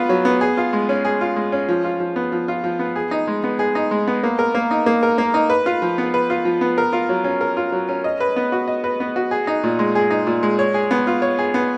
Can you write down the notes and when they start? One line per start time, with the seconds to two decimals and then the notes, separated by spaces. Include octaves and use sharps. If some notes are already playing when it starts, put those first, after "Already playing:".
Already playing: B3 F4 B4
0.09 F#3
0.25 B3
0.41 G#4
0.57 F4
0.73 G#3
0.89 C#4
1.05 G#4
1.21 F4
1.36 G#3
1.52 C#4
1.69 F3
1.84 F4
2.00 F3
2.16 B3
2.32 F3
2.48 F4
2.64 F3
2.79 B3
2.96 G#4
3.11 D#4
3.28 G#3
3.44 B3
3.59 G#4
3.75 D#4
3.91 G#3
4.07 B3
4.23 A#3
4.39 A#4
4.55 A#3
4.71 D#4
4.86 A#3
5.03 A#4
5.18 A#3
5.34 D#4
5.50 B4
5.66 F4
5.82 F3
5.98 B3
6.14 B4
6.30 F4
6.45 F3
6.61 B3
6.78 A#4
6.93 F4
7.09 F#3
7.24 C#4
7.41 A#4
7.57 F4
7.72 F#3
7.89 C#4
8.04 D#5
8.20 B4
8.36 B3
8.52 F#4
8.68 D#5
8.84 B4
9.00 B3
9.16 F#4
9.31 G#4
9.47 D#4
9.64 A#2
9.79 G#3
9.95 G#4
10.10 D#4
10.27 A#2
10.43 G#3
10.59 C#5
10.74 G#4
10.91 B3
11.07 F4
11.22 C#5
11.38 G#4
11.54 B3